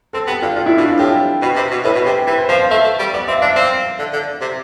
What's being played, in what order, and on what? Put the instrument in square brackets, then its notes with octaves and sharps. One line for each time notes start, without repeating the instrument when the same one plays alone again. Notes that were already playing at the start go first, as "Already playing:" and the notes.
[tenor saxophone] C4 [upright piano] A4
[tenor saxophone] B3 [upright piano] G4
[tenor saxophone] D3 [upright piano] F4
[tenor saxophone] D3 [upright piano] F4
[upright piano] E4
[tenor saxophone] B2 [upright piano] D4
[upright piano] F4
[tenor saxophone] A2 [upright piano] G4
[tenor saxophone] B2 [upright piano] B4
[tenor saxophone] C3
B2
[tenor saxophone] A2 [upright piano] B4
[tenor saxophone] B2
[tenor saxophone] C3 [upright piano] G4
[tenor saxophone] E3 [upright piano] B4
[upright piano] C5
[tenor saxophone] F3 [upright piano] C5
[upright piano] F5
[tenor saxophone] A3 [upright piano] E5
[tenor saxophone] A3
G3
[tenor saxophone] B3 [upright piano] D5
[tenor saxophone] C4 [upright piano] E5
[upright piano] F5
[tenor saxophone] D4 [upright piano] E5
[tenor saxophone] C4 [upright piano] F5
[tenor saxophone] D3
D3
C3